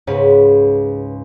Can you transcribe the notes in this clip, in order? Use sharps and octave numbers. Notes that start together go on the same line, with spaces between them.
C#2 G#2 B4 C#5